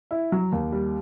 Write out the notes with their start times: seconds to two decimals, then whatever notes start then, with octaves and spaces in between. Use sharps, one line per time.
0.11 E4
0.32 F#3
0.52 D#2
0.72 G3